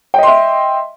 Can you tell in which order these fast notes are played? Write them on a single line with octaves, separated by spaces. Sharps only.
G5 D#5 C6 E5